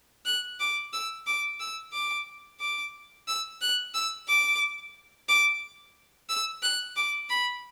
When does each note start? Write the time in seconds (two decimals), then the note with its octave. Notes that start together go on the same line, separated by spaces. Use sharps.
0.26 F#6
0.60 D6
0.93 E6
1.26 D6
1.60 E6
1.93 D6
2.60 D6
3.28 E6
3.61 F#6
3.94 E6
4.28 D6
5.28 D6
6.29 E6
6.62 F#6
6.96 D6
7.29 B5